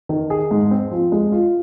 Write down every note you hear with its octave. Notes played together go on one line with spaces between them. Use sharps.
D#3
G#4
G#2
C4
F3
G#3
F4